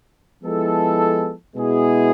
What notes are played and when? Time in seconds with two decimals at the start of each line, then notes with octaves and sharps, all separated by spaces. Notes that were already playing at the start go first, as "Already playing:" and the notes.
0.43 F3 G#3 B3 E4 A4
1.56 B2 G#3 B3 E4 G#4